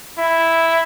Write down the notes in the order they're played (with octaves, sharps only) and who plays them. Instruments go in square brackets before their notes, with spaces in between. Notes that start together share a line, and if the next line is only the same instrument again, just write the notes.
[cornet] E4